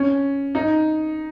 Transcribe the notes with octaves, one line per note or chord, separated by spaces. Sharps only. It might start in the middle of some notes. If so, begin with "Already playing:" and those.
Already playing: C#4
D#4